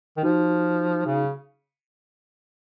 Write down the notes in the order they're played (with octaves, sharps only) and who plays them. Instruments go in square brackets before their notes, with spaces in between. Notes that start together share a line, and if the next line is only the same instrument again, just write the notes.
[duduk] D#3
[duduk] F3 [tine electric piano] D#4 F#4
[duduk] C#3